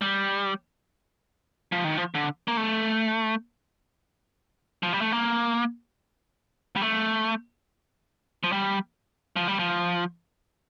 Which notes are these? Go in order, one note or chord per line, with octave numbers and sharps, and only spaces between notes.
G3
F3
D#3
F3
D3
A#3
A3
F3
G3
A3
A#3
G3
A3
F3
G3
F3
G3
F3